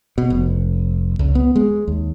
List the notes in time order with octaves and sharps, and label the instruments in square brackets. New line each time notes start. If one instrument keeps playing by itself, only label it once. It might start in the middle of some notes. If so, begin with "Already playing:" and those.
[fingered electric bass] B2
F1
C#2
B3
G#3
D#2